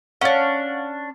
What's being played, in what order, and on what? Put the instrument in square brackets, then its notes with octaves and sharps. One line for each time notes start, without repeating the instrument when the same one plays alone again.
[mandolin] C#4 D4 [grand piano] C#5 F5 F#5